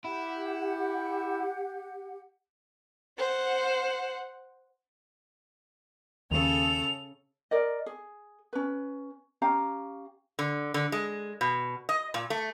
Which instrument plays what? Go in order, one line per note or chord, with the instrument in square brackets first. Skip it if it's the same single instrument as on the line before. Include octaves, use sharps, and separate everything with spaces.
[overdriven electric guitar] E4 [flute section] G4 F#5
[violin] C5 F#5
[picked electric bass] D#2 [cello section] C#3 A4 [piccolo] F7
[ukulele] A#4 D5 D#5
G#4
C#4 B4
C#4 G4 F5 A#5
[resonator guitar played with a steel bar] D3
D3
G#3
B2
D#5
A#2
A3